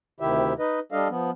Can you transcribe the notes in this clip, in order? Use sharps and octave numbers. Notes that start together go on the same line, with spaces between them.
D2 C3 D#3 E4 G4 E5
D#4 B4 D#5
G3 D4 A4 D#5 F5
F3 B3